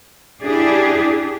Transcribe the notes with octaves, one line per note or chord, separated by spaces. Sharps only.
D4 E4 G4 G#4